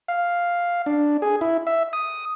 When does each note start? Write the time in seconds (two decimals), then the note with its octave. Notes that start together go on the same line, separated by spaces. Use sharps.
0.08 F5
0.86 D4
1.22 G#4
1.41 E4
1.67 E5
1.93 D#6